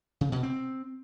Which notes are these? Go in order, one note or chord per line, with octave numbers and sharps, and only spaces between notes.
C#3
B2
C4